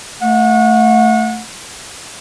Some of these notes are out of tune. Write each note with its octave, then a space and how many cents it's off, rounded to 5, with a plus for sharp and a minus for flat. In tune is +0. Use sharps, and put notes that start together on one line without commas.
A3 +0 F#5 -35